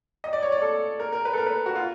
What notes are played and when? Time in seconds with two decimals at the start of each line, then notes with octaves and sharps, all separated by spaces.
0.24 D#5
0.33 D5
0.43 C#5
0.52 D5
0.62 A4
1.00 A#4
1.12 A#4
1.25 B4
1.33 A4
1.38 A#4
1.47 B4
1.66 F#4
1.76 F4